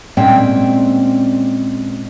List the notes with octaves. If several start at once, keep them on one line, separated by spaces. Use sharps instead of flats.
A#2 G#3 C4 C#4 G5